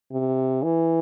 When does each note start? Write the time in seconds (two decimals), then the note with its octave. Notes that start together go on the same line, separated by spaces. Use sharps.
0.12 C3
0.63 E3